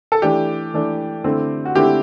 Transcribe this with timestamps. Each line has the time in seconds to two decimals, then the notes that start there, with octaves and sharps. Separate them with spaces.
0.12 A4
0.22 E3 A3 D4 G4
0.74 E3 A3 D4
1.24 D3 A3 C4 E4
1.65 F#4
1.75 D3 A3 C4 E4 G4